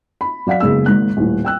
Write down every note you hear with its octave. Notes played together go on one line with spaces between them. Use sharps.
B5
F#3 D5 F5 F#5 B6
F#1 C#3 G#3 B3 E6
G#1 G#2 A#3 F#6
D#1 A2
G5 E6 F#6